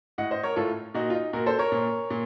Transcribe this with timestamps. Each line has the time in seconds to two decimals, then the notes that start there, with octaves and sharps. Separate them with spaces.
0.18 A2 D#5 F#5
0.31 C5 D#5
0.43 A#4 C#5
0.56 A2 F4 A4
0.94 A#2 D#4 F#4
1.10 F4
1.14 D#4
1.33 A#2 F#4 A#4
1.46 A4 C5
1.59 A#4 C#5
1.72 A#2
2.10 A#2